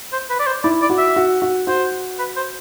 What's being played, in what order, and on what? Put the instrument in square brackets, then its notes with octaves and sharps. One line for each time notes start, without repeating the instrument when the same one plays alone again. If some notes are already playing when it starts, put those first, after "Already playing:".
[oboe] C5
B4
D5
C5
[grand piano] E4 [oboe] D5
[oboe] D5
[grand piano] F#4
[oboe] E5
[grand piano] F#4
F#4
[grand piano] F#4 [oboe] C5
[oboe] B4
C5